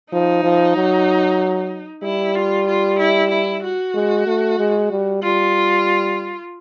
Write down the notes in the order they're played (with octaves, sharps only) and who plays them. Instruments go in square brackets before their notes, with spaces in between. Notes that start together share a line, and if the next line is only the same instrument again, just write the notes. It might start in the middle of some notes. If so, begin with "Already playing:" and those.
[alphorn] F3 [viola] D#4
[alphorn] F3
F#3
[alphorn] G3 [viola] E4
[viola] F4
F4
E4
E4
F#4
[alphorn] G#3
A3
G#3
G3
[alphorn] G3 [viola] F4